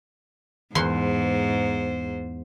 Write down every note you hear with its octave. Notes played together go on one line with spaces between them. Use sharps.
E2 G#2 C5 C6